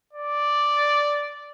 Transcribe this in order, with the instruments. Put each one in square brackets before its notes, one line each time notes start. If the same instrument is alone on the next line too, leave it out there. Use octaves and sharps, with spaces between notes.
[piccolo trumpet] D5